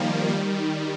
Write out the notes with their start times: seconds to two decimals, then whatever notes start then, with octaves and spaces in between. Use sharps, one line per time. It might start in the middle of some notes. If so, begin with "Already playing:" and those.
Already playing: D#3 F3 G3 A#3
0.29 D#3 G3